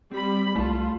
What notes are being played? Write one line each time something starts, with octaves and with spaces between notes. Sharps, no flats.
G3 C4 B5
C2 A3 F4 A5